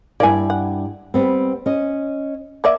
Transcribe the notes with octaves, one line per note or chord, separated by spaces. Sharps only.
G2 A#3 E4 D5 G#5
F#5
G3 B3 C4
C#4 D#5
A#3 D5 E5